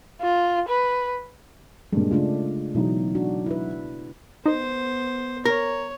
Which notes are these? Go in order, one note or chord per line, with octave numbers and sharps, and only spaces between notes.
F4
B4
G2 A#2 G#3
C#3 A3 D4 F4
B2 E3 F#3 D#4
D4 F#4
E4 B4
B3 D#4 C5 D#5
A#4 C#5